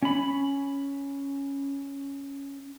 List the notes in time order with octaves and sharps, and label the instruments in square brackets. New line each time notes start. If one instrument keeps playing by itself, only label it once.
[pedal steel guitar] C#4 B5